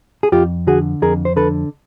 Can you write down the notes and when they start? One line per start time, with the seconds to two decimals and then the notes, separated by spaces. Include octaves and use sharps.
0.23 G#4
0.32 F2 F4 G4
0.67 D3 F#4 G#4
1.02 F2 G#4 A#4
1.25 C5
1.36 D3 A4 B4